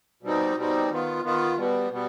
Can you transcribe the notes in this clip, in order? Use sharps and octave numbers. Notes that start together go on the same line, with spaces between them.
B2 G3 C4 D#4
B2 G3 C4 D#4
D#3 B3 F4
D#3 B3 F4
B2 G3 B3
B2 G3 B3